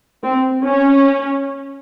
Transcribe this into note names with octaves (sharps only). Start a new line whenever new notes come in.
C4
C#4